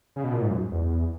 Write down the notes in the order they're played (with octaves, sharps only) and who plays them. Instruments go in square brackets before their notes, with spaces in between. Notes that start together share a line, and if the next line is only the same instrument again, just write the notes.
[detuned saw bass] C#3
B2
A#2
G#2
F#2
E2